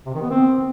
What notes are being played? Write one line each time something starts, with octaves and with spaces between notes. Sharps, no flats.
C3
D#3
B3
C4